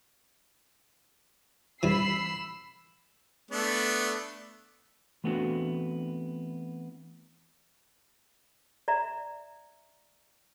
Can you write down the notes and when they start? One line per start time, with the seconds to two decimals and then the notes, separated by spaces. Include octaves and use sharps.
1.83 G2 E3 B5 E6 C7
3.51 A3 B3 D4
5.24 E3 A3 B3 C4 D4 F#4
8.88 D5 E5 A#5